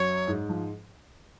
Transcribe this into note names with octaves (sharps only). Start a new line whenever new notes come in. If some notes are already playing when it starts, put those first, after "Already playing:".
Already playing: F#2 F#3 C#5
G#2 G#3
F3